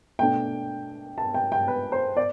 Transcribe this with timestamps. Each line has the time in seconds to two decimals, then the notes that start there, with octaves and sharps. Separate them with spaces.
0.19 B2 A3 D4 G5
1.18 A5
1.34 G5
1.52 G5
1.68 B4
1.92 C5
2.17 D5